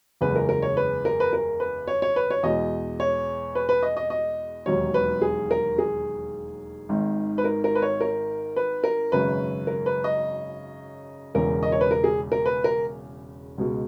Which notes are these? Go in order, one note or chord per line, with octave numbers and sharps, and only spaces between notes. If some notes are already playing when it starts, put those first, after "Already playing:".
F#1 E2 C#3 G#3 B4
A#4
A#4
C#5
B4
A#4
B4
A#4
B4
C#5
C#5
B4
C#5
E2 B2 G#3 D#5
C#5
B4
B4
D#5
D#5
D#5
E1 D#2 D#3 F#3 C#5
B4
G#4
A#4
G#4
G#1 G#2 D#3
B4
A#4
A#4
B4
C#5
A#4
B4
A#4
G#1 F#2 C#3 B4
A#4
B4
D#5
E1 E2 C#3 A#4
D#5
C#5
B4
A#4
G#4
A#4
B4
A#4
C#2 B2 G#3